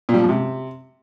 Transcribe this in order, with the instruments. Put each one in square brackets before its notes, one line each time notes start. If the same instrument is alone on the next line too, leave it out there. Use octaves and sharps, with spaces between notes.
[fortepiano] A#2
G3
F3
G#2
C3